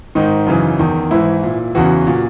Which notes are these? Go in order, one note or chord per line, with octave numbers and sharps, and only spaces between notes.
G#2 D#3 D#4
F#2 C#3 E3
E2 D#3
G#2 E3 E4
A#2
E2 C#3 E3 F#4
A#2